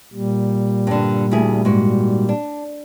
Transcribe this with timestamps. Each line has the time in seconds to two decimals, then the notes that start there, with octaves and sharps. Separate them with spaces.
0.14 A#2 G3
0.87 G2 D3
1.31 D2 E4 G#4
1.65 G#2 F#4
2.29 D4